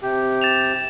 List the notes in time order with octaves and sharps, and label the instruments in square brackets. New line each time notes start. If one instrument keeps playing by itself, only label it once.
[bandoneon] C3 G4
[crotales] A6 E7 F7